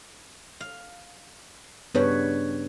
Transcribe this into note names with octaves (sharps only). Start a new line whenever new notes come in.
F5
G2 C#3 G3 B3 B4 C#5